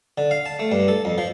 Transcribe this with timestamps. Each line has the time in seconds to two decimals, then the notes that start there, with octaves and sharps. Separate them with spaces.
0.18 D3
0.31 F5
0.46 A5
0.59 A3
0.72 G2
0.88 A4
1.05 F2
1.18 F3